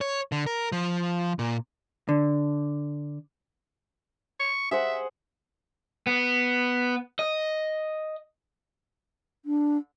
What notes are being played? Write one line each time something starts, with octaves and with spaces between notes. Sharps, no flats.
C#5
D3
A#4
F3
A#2
D3
C#6
G#4 C5 E5 F#5
B3
D#5
D4